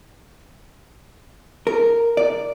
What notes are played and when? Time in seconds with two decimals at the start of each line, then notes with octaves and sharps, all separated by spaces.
1.67 A#4
2.17 D5